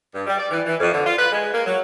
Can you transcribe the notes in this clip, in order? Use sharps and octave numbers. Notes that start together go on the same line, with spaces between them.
G2
G3
D5
E3
E3
F2
D3
F4
B4
G#3
A#3
F#3